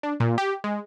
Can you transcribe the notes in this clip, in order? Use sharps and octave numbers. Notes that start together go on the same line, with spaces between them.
D4
A#2
G4
G#3